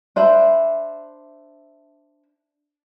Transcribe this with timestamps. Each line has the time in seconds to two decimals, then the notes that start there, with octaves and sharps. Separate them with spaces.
0.16 D4 C5 E5 B5